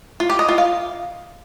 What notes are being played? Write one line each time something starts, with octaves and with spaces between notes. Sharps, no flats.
F4
G4
D#5
F4
F5